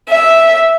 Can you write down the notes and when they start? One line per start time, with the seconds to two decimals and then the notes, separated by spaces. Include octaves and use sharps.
0.10 E5